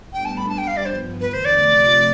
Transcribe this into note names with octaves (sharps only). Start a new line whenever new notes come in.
A2 G3 B3 D4 A4 G5
A5
B5
G3 D4 G4 B4 A5
G5
F5
D5
G2 F3 B3 C5
E2 D3 A3 B4
C5
D5
C3 F3 A3